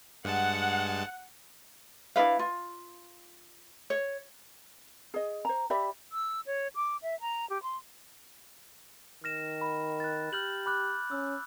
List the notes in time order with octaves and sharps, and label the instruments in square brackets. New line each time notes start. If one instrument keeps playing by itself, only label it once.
[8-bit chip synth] G2 G#3 A5 [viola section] F#5
[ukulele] D4 E4 B4 F5
F4
C#5
G#4 D#5
C5 A#5
G4 D5 E5 B5
[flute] E6
C#5
D6
E5
A#5
G4
C6
[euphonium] D#3 [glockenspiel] F6 A#6 E7
[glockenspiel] B5
F#6 A6
[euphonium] G4 [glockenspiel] F6 G6 F#7
[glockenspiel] B5 D6 F#6
[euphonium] C#4 [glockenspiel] E6